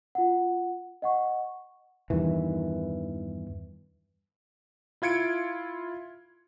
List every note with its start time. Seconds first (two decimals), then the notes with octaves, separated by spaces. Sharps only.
0.15 F4 F#5
1.02 D#5 F#5 C#6
2.10 E2 G2 D#3 E3
5.02 E4 F4 G#6 C#7 D7